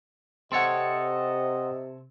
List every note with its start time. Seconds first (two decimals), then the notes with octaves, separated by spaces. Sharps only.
0.52 C3 C4 A4 C#5 D#5 F#5 C6